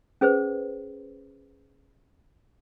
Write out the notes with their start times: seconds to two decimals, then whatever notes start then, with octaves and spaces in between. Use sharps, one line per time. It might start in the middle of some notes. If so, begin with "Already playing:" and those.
0.21 C#4 G#4 B4 C5